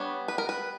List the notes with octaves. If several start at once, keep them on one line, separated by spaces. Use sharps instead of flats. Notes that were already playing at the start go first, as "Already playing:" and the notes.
Already playing: G3 B3 D4 C#5
B4
A#4
B4